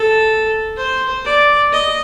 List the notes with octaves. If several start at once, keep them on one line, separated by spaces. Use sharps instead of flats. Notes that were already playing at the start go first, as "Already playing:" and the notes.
Already playing: A4
C5
D5
D#5